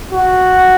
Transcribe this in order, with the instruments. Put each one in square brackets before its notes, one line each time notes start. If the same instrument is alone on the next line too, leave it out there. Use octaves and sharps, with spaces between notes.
[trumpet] F#4